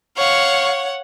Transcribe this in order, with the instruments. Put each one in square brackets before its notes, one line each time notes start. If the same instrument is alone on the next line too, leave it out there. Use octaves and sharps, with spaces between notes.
[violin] C#5 F#5 [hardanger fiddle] F5 C#6